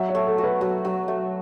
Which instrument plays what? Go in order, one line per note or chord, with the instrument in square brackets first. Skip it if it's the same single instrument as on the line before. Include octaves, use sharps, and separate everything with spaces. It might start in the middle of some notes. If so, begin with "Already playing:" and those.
Already playing: [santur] F#3 [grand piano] E5
[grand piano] C#5
[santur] A3
[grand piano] A4
[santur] F#4
[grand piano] B4
[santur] F#3 [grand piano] A4
[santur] F#3
A3